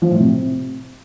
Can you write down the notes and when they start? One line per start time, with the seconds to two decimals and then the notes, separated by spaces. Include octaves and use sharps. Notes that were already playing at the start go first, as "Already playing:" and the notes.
0.02 F3
0.11 A2
0.20 C3